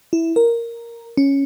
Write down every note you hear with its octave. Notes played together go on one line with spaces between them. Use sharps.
E4
A#4
C#4